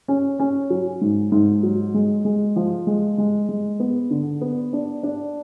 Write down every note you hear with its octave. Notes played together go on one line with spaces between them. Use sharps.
C#4
C#4
F#3
G#2
G#2
F#3
G#3
G#3
F3
G#3
G#3
G#3
B3
D3
B3
D4
D4